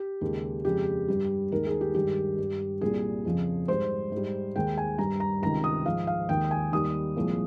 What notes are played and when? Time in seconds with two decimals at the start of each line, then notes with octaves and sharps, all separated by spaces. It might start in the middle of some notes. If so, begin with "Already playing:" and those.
Already playing: G4
0.21 D#2 C#3 G#3
0.65 F2 C#3 G#3 G4
1.08 G2 G3
1.51 D#2 D#3 G#3 A#4
1.67 G#4
1.81 G4
1.94 G2 D#3 G#3 G4
2.39 G2 G3
2.81 C2 A#2 G3 G#4
3.25 F2 C#3 F3
3.68 G#2 G3 C5
4.12 G#2
4.17 G3
4.56 D#2 D#3 G#3 G5
4.78 G#5
4.98 G2 G3 A#5
5.20 A#5
5.42 C#2 C3 D#3 A#5
5.64 D#6
5.85 G#2 F3 G#3 F5
6.07 F5
6.29 D#2 D#3 G#3 G5
6.51 G#5
6.72 D#2 D#3 G3 D#6
7.17 C2 A#2 F3 G#3